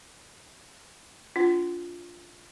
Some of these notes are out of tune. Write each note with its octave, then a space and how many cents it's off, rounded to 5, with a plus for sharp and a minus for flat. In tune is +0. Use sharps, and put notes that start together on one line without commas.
D4 -25 F4 +0 F#5 +30